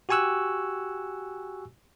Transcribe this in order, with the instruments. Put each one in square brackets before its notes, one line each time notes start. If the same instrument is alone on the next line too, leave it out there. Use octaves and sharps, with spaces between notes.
[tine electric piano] F#4 G4 G#5 C#6 E6 F#6